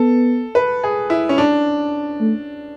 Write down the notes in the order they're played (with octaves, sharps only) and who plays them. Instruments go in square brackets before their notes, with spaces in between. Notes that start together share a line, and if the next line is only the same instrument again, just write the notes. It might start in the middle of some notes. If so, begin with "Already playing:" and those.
Already playing: [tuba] B3 [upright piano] A4
[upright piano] B4
G#4
E4
C#4
D4
[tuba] A3